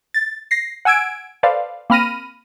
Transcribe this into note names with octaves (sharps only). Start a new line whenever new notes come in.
A6
A#6 C7
F#5 G#5 E6 G#6 D7
A4 B4 C5 D5 F5
A#3 C4 B5 F6 A#6 D#7